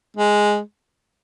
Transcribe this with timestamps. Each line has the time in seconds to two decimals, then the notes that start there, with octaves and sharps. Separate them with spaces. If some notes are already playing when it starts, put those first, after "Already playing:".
0.17 G#3